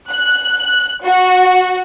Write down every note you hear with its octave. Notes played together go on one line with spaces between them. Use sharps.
F#6
F#4